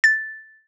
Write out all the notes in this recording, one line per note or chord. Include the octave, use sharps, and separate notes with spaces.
A6